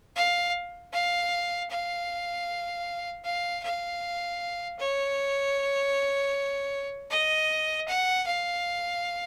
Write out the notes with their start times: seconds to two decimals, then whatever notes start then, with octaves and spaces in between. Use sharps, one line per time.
0.16 F5
0.93 F5
1.70 F5
3.25 F5
3.63 F5
4.79 C#5
7.11 D#5
7.88 F#5
8.27 F5